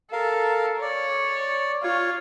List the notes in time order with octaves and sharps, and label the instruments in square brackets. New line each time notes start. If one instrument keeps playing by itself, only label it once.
[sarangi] A4 [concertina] A#4 F5
[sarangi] C#5 [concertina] D5
[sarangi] F4 [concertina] C#5